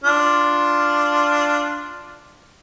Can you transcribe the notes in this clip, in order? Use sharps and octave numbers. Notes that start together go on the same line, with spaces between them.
D4 F4